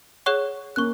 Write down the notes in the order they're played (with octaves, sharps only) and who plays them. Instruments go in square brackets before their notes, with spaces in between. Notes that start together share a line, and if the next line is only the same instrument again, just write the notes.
[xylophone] G#4 C#5 F#5 C#6 F#6
[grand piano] A#3 C#4 [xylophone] C#6 F#6